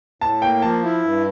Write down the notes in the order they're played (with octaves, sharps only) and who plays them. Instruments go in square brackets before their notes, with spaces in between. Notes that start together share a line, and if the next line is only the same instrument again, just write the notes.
[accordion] A2 [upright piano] A5
[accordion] A#3 [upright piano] G5
[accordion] F3 [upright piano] A5
[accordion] E4
G2